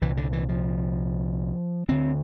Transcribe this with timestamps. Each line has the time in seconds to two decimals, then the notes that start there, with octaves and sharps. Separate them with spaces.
0.01 C2 A#2 E3
0.17 D3
0.33 E3
0.49 F3
1.88 D2 D3 C4